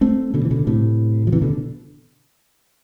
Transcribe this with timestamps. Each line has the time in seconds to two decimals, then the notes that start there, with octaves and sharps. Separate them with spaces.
0.01 A3 C4
0.34 B2 D3
0.45 E3
0.51 B2 D3
0.67 A2 C3
1.27 F3
1.32 C3 E3
1.42 B2 D3